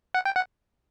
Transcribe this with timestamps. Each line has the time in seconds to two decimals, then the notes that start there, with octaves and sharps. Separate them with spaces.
0.14 F#5
0.25 G5
0.36 F#5